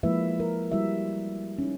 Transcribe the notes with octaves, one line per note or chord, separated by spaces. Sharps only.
F3 G#3 A#3 E4 B4 E5
A#4
G3 E4 F#4 E5
C#4 D#4